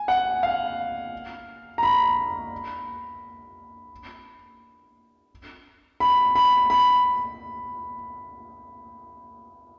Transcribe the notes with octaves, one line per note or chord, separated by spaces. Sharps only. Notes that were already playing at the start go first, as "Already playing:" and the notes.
Already playing: G#5
F#5
F5
A#5
B5
B5
B5
B5